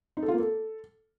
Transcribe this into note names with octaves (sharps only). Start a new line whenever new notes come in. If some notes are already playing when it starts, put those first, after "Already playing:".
D#4
A4
F4
A#3
A4